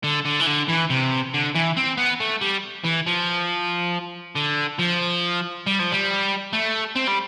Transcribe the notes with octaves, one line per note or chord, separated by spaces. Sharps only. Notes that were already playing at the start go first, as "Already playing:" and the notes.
D3
D3
E3
D3
E3
C3
D3
E3
C4
B3
A3
G3
E3
F3
D3
F3
G3
F3
G3
A3
C4
G3